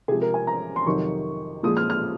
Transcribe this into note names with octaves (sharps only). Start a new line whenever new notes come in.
C3 F3 G#3 G#4
A#4
G#5
A#5
C6
F2 C3 D#3 F#3 C#6
A#2 F3 G#3 D#6
F6
F6